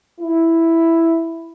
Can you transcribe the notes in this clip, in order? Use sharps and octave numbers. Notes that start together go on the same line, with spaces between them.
E4